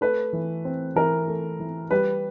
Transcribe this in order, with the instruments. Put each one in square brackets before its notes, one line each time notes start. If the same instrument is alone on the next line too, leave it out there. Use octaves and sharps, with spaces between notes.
[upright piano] A3 B4
E3
C4
E3 A#4
A3
E3
G3 B4